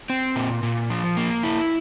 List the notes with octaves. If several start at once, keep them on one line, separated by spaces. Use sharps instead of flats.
C4
A#2
A#2
F3
A#3
E4